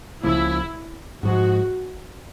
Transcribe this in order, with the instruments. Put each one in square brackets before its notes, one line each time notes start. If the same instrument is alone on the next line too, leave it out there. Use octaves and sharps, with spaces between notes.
[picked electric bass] C#2 C#3 F3 A#3 [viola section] E4
[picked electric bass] G#2 F3 G#3 [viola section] F#4